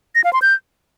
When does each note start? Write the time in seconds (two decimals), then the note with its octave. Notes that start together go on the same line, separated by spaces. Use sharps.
0.15 A#6
0.24 F5
0.33 C6
0.42 G6